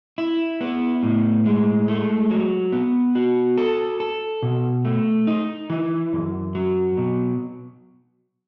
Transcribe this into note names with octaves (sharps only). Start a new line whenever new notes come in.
E4
B3
A2
G#3
A3
F#3
B3
F#4
A4
A4
B2
A3
D#4
E3
F#2
F#3
B2